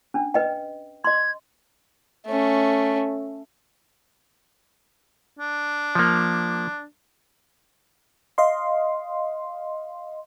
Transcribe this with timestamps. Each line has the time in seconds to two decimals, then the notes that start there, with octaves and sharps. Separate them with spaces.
0.14 C#4 D4
0.34 B4 D#5 G5
1.04 D#5 C6 G#6
2.26 A3 C#4
5.39 D4
5.95 F3 A#3
8.38 D#5 F5 C6